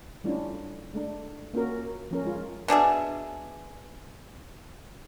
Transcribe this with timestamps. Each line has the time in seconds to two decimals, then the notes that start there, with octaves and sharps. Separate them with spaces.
0.24 G3 A3 C#4 D4 E4 F4
0.93 G#3 A3 D4
1.54 A#3 C#4 F4 F#4 A#4
2.11 F3 C#4 A#4
2.24 G#3 F4
2.68 B2 D4 G#4 E5